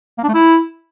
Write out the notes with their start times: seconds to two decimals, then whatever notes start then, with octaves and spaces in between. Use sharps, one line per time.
0.18 A#3
0.23 D4
0.29 A3
0.34 E4